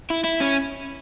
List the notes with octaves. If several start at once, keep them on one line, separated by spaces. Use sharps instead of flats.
E4
E4
C#4